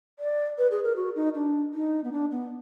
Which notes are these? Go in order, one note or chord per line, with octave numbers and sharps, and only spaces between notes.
D5
B4
G#4
A#4
F#4
D#4
D4
D#4
B3
D4
B3